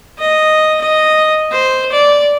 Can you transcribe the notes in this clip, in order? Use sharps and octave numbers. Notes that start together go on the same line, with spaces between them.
D#5
D#5
C5
D5